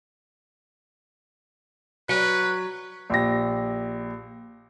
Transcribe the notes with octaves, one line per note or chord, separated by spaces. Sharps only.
F#3 B4
A#1 G4 A#6